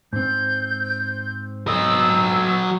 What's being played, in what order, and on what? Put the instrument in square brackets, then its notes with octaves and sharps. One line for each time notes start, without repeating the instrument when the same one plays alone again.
[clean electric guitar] G#2 C4 [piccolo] G6
[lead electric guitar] F#3 D#5 [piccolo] E6